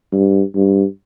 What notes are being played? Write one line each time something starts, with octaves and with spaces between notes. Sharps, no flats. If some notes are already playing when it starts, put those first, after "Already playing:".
G2
G2